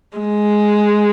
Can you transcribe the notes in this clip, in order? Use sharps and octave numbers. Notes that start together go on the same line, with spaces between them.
G#3